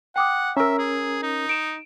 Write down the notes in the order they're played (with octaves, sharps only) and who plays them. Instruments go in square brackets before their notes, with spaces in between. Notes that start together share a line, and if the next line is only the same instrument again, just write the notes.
[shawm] F#5 [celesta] G5 D6 D#6
[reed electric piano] C#4 A#4 [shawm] E5 [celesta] A#5 E6
[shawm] G#4
D#4
[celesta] D7 E7